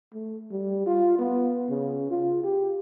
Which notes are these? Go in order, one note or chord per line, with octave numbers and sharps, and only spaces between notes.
A3
G3
F4
B3
C#3
F4
G4